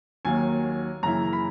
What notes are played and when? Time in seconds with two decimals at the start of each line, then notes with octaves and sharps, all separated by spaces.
0.25 D#2 D#3 F#3 A#3 G#5
1.03 F#2 C#3 E3 A#3 E4 A#5
1.33 B5